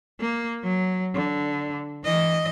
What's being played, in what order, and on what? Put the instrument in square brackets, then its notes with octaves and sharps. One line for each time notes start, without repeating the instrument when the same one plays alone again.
[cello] A#3
F#3
D3
E3 D#5